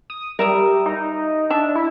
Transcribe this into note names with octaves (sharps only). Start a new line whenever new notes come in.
D#6
G3 A#4 E5 D#6
D#4
D4 E5
E4